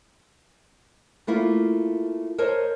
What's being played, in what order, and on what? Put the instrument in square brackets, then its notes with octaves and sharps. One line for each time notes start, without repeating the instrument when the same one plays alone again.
[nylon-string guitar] A3 A#3 E4 F4
A#4 C5 C#5 D#5 A5